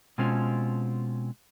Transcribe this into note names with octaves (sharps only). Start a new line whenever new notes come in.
B2 G#3 C4 C#4 F4